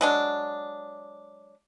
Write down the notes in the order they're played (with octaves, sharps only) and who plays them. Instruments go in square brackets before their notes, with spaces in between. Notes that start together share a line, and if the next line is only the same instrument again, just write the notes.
[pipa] F#3 G#3 D4